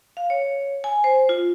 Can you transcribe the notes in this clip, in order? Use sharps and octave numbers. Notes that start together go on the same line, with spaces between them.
F5
C#5
G#5
C5
F4